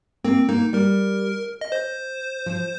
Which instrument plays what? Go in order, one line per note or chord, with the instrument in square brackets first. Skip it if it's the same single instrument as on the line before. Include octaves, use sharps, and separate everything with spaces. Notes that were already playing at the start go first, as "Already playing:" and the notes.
[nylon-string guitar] A#3 [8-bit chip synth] C4
[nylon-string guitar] A#3 [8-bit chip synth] D#4
[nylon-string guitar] G3 [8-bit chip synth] A#4
[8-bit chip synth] D#5
C5
[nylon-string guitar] F3